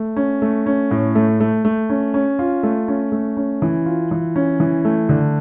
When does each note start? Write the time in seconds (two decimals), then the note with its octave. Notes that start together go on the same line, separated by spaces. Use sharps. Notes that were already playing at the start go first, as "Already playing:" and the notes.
Already playing: A3
0.16 C#4
0.42 A3
0.66 C#4
0.91 A2
1.15 A3
1.40 A3
1.65 A3
1.90 C#4
2.14 C#4
2.39 F4
2.63 A3
2.88 C#4
3.12 A3
3.37 C#4
3.62 E3
3.86 F4
4.11 E3
4.36 C#4
4.60 E3
4.85 A3
5.09 D3